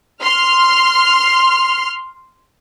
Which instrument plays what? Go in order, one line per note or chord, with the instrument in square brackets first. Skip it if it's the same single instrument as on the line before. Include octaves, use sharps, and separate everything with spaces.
[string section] C6 F6